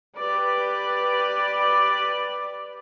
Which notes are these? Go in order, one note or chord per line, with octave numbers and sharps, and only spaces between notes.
G4 B4 D5